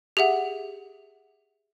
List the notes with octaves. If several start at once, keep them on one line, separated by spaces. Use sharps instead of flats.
G4 G#4 E5 F#5